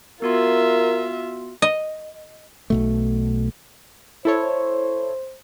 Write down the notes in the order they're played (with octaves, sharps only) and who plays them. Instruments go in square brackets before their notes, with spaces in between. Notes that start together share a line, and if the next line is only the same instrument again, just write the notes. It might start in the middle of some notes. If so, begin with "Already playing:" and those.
[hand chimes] B3 F#4 C6 [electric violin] F4 E5 [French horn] A#4
[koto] D#5
[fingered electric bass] B1 B2 A3
[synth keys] E4 A4 C#5 [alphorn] C5